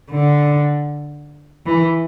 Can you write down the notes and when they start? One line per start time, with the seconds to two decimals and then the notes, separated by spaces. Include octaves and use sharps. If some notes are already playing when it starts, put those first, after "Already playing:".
0.11 D3
1.66 E3